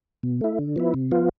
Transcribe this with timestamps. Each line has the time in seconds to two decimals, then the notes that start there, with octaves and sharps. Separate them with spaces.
0.23 B2
0.41 A3 E4
0.59 D3
0.76 F3 B3 E4
0.94 C3
1.11 F3 B3 F4